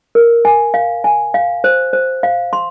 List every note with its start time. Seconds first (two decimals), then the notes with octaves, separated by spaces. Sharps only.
0.15 A#4
0.45 G#5
0.74 F5
1.04 G#5
1.34 F5
1.64 C5
1.93 C5
2.23 F5
2.53 C6